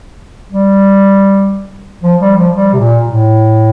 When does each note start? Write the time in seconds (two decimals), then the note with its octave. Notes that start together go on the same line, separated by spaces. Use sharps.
0.51 G3
2.03 F3
2.20 G3
2.37 F3
2.54 G3
2.73 C3
2.79 A#2
3.05 A2